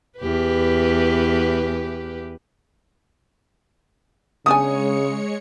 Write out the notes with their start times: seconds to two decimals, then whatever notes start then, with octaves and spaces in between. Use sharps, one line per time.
0.19 E2 G4 B4
4.46 C#3 G#3 B3 D4 C#5 G#5 D#6 C#7